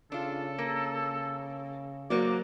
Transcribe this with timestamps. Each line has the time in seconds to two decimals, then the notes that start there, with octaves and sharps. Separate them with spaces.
0.12 C#3 D4 F4 A4
0.58 A#3
2.10 F#3 A#3 F#4 C5 D5 D6